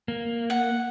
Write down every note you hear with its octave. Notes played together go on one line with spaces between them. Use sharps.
A#3
F#5